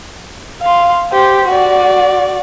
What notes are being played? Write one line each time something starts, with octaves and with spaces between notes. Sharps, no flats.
F5 C6
G4 C5
F#4 D5